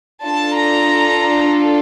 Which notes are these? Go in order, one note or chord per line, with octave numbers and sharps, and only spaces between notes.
D4 F4 A4 A5
A#5